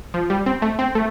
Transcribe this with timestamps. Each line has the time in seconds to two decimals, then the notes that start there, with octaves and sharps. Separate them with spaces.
0.14 F3
0.30 G3
0.46 C4
0.62 A3
0.79 C4
0.95 A3